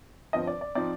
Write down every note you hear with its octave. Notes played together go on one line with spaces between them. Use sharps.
G1 G2 F3 C4 D#5
D5
D5
F3 C4 D#4 D5